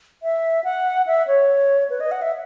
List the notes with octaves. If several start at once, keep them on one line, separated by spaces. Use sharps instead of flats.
E5
F#5
E5
C#5
B4
D#5
F#5
E5